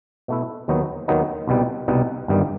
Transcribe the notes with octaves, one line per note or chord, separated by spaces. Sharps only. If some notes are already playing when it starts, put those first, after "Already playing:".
B2 A3 E4
D#2 D#3 F#3 B3 D#4
D#2 D#3 F#3 B3 D#4
C2 B2 G3 D#4
C2 B2 G3 D#4
G1 G2 D#3 G3 D#4